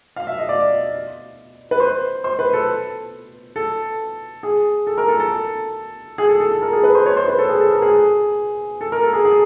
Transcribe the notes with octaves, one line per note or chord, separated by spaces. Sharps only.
F5
E5
D#5
D5
B4
C5
C5
B4
A4
A4
G#4
A4
A#4
A4
A4
G#4
A4
A4
A4
A#4
G#4
B4
C5
C#5
C5
B4
A4
G#4
A4
A#4
G#4
A4
A#4
A4
G#4
G#4